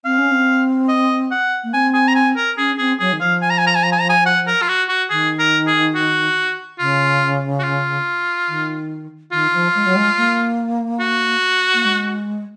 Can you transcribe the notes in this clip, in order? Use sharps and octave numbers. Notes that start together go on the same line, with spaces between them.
C4 F5
C#4
C4
D#5
F#5
A#3
C4 G#5
G#5
A#5
G#5
A#4
C#4 G#4
C4 G#4
F#3 G#4
D#3
F3 F5
G#5
A#5
G#5
A#5
G#5
A#5
G#5
A#5
G#5
F#5
A#4
F4
F#4
F#4
D#3 G#4
A#4
G#4
F#4
C#3 F4
F#4
F4
D#3
D#3 F4
F3
G#3
F#3
G#3
A#3
F#4
A#3
G#3